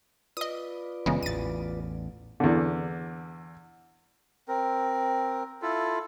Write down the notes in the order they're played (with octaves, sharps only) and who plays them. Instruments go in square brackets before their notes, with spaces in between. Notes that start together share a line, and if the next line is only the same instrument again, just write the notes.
[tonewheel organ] F4 B4 D5 [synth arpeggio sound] D#5 D#6
[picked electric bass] F#1 E3 B3 [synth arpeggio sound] C#3 G#3
[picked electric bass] A1 E2 [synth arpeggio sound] A6 D#7
[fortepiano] E2 D3
[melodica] C4 A#4
E4 F4 A4